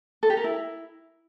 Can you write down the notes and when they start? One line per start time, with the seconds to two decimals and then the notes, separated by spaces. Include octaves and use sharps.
0.23 A4
0.30 G4
0.37 A#4
0.44 E4